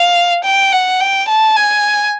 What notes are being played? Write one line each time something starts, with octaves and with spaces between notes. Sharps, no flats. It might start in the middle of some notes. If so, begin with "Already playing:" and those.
Already playing: F5
G5
F#5
G5
A5
G#5